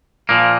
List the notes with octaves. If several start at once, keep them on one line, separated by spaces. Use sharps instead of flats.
A#2 F3 A#3